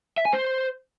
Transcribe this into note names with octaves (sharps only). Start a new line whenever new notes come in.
E5
G#5
C5